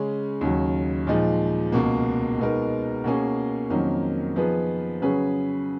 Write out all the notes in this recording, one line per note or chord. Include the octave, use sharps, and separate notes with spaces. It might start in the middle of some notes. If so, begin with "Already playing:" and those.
Already playing: C#3 G#3 C#4
D#2 C#3 F#3
A#2 F3 G#3 D#4
C#2 B2 A#3
B2 G#3 B3 D#4 A#4
B2 A#3 C#4 G#4
F2 D#3 F#3 A#3 C#4
F3 B3 D#4 G#4 B4
C#3 F#3 C#4 G#4 B4